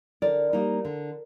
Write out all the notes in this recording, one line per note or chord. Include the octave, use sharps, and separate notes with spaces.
D3 A#4 D5
G3 A#3 D#4
D3